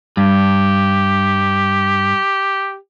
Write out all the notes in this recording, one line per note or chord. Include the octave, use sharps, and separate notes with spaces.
G2 G4